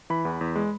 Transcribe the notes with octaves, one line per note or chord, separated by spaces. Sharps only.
E3 B5
E2
E2
G#3